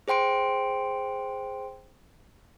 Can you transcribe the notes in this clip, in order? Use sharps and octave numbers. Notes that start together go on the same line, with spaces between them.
G#4 C5 G5 C6 D7